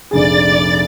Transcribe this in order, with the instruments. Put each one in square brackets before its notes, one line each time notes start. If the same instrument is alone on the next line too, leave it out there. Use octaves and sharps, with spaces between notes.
[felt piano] F1 A#1 G#4 [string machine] D5 A6